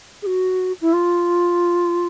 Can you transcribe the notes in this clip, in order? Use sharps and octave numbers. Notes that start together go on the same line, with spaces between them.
G#4
F#4
E4
F4